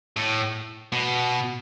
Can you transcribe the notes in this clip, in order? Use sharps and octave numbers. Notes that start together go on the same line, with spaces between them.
A2
B2